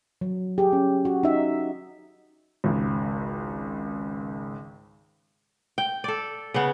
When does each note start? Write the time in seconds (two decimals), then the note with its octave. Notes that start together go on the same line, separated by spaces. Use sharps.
0.21 F#3
0.58 G4 G#4
0.73 C#4
1.05 F#4
1.23 D#4 E5
2.64 G#1 C#2
5.78 G5
6.04 A4 D5
6.54 C#3 B3